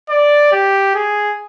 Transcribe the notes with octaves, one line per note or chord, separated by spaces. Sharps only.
D5
G4
G#4